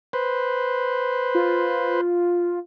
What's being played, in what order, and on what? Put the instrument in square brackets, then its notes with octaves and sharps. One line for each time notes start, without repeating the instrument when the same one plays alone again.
[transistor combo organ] B4 C5
[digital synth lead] F4